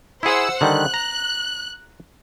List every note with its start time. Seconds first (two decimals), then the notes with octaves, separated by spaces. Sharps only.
0.23 E4 G#4 C5 F#5 E6
0.61 D3 D#3 G3 F#6
0.94 A#5